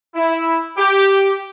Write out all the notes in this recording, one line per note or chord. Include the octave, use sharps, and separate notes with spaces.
E4
G4